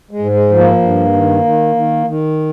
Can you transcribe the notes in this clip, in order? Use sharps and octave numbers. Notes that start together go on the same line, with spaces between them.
G#3
G#2
G#3
F3
A#3
G2
D#3
D#3
D#3
D#3